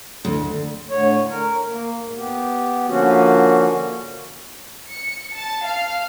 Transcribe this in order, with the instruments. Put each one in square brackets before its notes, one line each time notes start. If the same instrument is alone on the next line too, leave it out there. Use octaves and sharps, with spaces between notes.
[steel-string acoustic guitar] D2
[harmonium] A2 D3 C#5
A#4
A#3
G#2
B3 G4
D3 F3 A#3 C#4 F#4
[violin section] C#7
A5
F5